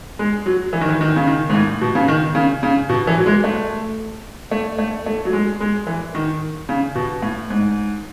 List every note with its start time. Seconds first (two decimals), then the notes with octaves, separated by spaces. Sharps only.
0.19 G#3
0.46 F#3
0.73 E3
0.81 D#3
0.89 E3
1.01 D#3
1.16 C#3
1.27 D#3
1.50 G#2
1.55 A2
1.81 B2
1.95 C#3
2.08 D#3
2.35 C#3
2.63 C#3
2.89 B2
3.07 E3
3.18 F#3
3.26 G#3
3.44 A3
4.51 A3
4.78 A3
5.06 A3
5.25 F#3
5.33 G#3
5.61 G#3
5.87 E3
6.15 D#3
6.69 C#3
6.95 B2
7.22 A2
7.50 G#2